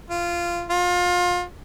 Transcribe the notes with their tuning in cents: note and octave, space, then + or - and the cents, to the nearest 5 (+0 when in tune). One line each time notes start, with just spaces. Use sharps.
F4 -15
F4 +30